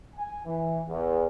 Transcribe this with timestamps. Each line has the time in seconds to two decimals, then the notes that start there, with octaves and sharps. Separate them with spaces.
0.16 G#5
0.46 E3
0.89 E2